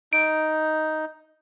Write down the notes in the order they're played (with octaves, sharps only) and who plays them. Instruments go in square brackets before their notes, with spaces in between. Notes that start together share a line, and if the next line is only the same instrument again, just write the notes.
[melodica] D#4 [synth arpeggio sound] D7